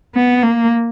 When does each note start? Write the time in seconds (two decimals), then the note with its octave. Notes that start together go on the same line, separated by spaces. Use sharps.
0.15 B3
0.43 A#3